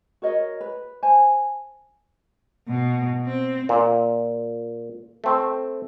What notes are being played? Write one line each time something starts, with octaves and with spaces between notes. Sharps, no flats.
F#4 A#4 C#5 D#5
B4
C5 G#5 A5
B2
C4
A#2
A3 C4